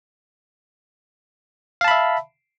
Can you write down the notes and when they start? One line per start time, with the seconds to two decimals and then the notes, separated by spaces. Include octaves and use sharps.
1.81 F5
1.84 A5
1.88 B5
1.91 E5